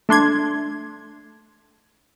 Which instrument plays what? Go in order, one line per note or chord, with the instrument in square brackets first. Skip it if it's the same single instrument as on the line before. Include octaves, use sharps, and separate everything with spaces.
[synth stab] A3 D4 C6 G#6